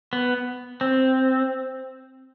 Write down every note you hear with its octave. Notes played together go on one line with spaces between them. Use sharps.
B3
C4